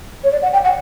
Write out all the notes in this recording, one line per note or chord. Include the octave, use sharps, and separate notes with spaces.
C#5
D5
F#5
G5
F#5